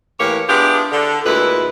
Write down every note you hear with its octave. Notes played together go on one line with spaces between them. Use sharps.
A2 E3 A#3 G4 C#5
B3 D4 E4 F4 G4 G#4
D3
D2 A#2 G#3 E4 B4